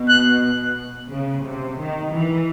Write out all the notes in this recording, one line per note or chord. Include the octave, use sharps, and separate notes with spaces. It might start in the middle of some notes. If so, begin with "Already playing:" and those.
Already playing: B2
F#6
C#3
C3
D#3
E3